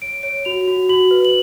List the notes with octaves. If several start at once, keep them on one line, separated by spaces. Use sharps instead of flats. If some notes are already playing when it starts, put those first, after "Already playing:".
C#5 D7
C#5 D7
F#4 F7
F#4
F#4 F#7
B4
F#7